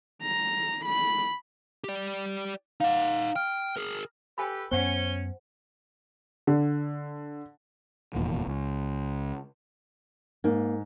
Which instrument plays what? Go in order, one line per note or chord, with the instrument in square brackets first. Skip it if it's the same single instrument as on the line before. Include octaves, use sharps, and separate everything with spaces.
[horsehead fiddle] A#5
B5
[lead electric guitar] G4 D5
[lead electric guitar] D#4 F#5 [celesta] F5
[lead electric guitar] G5 [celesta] F6
[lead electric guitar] G#4 A#4
[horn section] G4 A4 B4 [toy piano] G5 G#5 B5
[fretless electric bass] F#2 B3 [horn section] C#4 [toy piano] C5 F#5 [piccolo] G7
[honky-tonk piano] D3
[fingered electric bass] F1 E2 A#2 D#3
C#2
[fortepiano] G#2 [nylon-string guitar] A#3